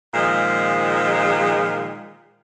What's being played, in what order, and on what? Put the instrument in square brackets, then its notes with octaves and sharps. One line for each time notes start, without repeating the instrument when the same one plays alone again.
[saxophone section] A#2 D#3 F3 G#3